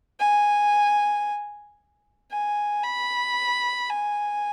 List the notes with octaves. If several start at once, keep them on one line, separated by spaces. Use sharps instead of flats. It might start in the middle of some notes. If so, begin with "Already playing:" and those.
G#5
G#5
B5
G#5